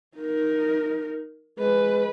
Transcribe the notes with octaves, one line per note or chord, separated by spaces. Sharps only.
D#4 A#4
G#3 B4